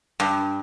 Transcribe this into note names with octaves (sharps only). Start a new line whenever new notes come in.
G2